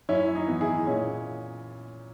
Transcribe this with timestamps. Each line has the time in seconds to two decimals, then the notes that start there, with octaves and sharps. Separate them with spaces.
0.09 F#2 C#4 E4
0.35 D#4
0.47 E3 B3
0.61 E4 G#4
0.87 A#2 C#4